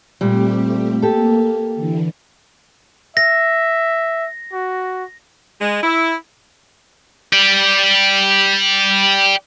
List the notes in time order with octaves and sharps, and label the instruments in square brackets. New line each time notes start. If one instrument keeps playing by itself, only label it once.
[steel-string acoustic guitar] A#2 G3 [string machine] A3 C4 G4
[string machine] A#3 [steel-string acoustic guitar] G4 A4
[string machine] D3 E3
[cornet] E5 [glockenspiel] A#6
[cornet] F#4
[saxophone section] G#3
E4
[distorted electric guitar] G4 D5